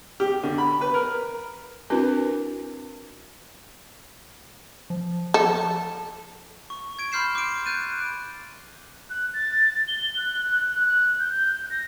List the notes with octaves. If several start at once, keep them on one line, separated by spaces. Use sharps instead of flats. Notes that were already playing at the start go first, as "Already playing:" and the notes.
G4
D3
B5
B4
A#4
C4 D4 E4 F#4 A#4 B4
F3
A4
C#6
G#6 D7
B5 C6 F6 G6 C7 E7
D6 D7
F#6 G6 A6 D#7
F#6
A6
G7
F#6
F#6
G6
A#6